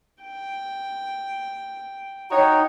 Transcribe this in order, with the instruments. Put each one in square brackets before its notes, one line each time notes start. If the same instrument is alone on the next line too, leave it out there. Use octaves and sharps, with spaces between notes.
[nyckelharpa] G5
[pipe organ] D#4 [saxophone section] F#4 C#5 [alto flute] G5